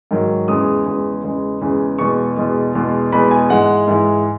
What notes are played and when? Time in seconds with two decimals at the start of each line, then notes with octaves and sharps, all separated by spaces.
0.11 G#2 D#3 F#3
0.48 E2 C#3 G#3 D#6
0.86 E2 C#3 G#3
1.24 E2 C#3 G#3
1.61 E2 C#3 G#3
1.99 E2 B2 G#3 C#6
2.37 E2 B2 G#3
2.75 E2 B2 G#3
3.12 E2 B2 G#3 B5
3.31 G#5
3.50 G#2 E3 G#3 F#5
3.88 G#2 E3 G#3